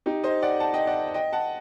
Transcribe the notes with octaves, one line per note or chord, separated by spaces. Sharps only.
D#4 G4
C5 D#5
D5 F#5
F#5 A5
D#5 G5
D5 F#5
D#5 G5
F#5 A5